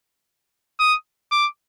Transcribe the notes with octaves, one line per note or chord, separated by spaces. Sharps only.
D#6
D6